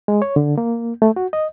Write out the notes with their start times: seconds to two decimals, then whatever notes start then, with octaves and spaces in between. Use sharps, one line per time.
0.08 G#3
0.22 C#5
0.36 D3
0.58 A#3
1.02 A3
1.16 F#4
1.33 D#5